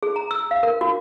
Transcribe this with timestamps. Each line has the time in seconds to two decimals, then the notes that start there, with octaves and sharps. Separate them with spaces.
0.03 G#4
0.16 A#5
0.31 E6
0.51 F5
0.63 A#4
0.81 F#4